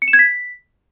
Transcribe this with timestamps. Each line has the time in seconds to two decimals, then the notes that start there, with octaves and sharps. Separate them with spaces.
0.02 C#7
0.08 E7
0.13 G#6
0.19 B6